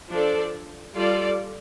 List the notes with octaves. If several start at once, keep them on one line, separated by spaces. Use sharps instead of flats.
F3 D4 A4 D5
G3 F4 A4 D5